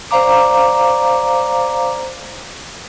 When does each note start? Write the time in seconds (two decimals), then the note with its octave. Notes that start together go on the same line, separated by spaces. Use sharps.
0.11 C5 D5 F5 A#5 D6